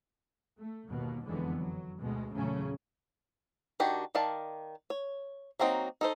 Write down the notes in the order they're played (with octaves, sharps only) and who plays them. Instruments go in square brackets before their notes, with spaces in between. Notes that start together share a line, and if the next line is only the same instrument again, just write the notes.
[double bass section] A3
G1 D#2 B2 A#3
F#1 F2 D3 E3 G#3 B3
F#3
D2 B2 G#3
E2 A#2 C#3 F#3 A3 C#4
[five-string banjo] D#3 D4 F#4 G4
D#3 D5 F5 A5
C#5
F#3 A#3 C4 D#4 F#4
D#4 A4 C5